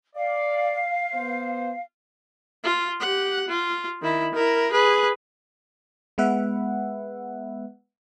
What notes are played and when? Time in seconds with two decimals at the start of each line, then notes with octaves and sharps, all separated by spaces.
0.16 D5 F5
1.14 B3 C5
2.64 F4
3.00 G4 F#5
3.48 F4
4.01 D#3 E4
4.34 E4 A#4
4.71 G#4 B4
6.18 G#3 B3 B4 E5 F#5